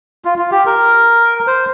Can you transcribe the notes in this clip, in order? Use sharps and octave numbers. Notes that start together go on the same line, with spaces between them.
F4
F4
G4
A#4
C5